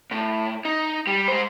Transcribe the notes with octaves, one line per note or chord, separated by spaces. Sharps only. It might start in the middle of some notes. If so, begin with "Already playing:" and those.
A2
D#4
G3
G#3 C5